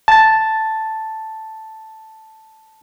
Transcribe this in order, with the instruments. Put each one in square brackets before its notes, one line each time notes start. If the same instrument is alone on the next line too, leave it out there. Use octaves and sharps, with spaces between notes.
[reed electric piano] A5 A6